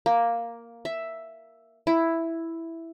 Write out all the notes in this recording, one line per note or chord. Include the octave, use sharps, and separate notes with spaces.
A#3
E5
E4